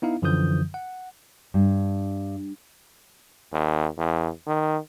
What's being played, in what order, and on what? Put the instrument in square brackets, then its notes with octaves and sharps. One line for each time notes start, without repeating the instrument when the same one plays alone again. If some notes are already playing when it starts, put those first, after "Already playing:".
[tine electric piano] B3 D#4 E4 F5
F#2 D3 E3 F3 D#6 G6
F#5
[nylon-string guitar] G2
[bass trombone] D#2
E2
D#3